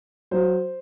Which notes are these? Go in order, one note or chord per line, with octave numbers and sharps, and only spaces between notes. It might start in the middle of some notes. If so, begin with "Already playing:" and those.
F#3 C5